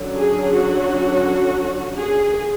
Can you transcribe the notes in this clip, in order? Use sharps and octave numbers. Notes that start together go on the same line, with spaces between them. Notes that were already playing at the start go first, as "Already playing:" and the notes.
Already playing: D3 F#3 C#4
G#4
F#4
G#4